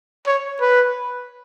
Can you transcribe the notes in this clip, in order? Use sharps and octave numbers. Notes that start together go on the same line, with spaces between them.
C#5
B4